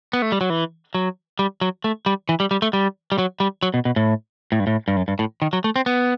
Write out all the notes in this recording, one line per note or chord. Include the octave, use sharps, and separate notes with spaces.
B3
A3
G3
F#3
E3
F#3
G3
F#3
A3
G3
E3
G3
G3
A3
G3
G3
F#3
G3
F#3
B2
B2
A2
A2
G2
A2
G2
F#2
G2
A2
D#3
F#3
A3
C4
B3